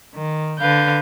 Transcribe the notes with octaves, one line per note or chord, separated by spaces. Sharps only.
D#3
D3 B4 F5 G6